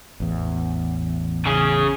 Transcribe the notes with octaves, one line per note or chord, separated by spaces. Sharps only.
A1 E2
C#3 G#4